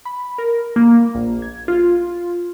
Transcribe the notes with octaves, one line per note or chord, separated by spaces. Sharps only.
B5
A#4
A#3
A#1
G#6
F4